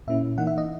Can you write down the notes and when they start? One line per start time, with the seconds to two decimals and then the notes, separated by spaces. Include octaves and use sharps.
0.08 A#2 A#3 C#4 E4 E5
0.37 E3 A#3 D#4 F#5
0.47 E5
0.58 D#5